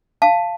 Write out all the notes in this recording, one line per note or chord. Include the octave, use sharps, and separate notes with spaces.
F5 A5